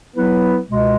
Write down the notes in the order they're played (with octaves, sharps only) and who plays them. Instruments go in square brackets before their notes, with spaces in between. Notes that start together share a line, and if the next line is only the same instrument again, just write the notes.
[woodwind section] F#3 B3 E4 B4
C#2 B2 G#3